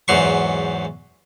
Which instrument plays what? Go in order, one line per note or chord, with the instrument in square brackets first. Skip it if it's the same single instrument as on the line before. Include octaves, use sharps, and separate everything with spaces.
[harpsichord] E2 G#2 F#3 C6 C#6